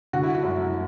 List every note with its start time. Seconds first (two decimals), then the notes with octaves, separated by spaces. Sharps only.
0.13 D3 F#4
0.23 E4
0.35 F#4
0.43 F#2